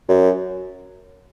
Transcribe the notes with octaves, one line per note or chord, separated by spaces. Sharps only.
F#2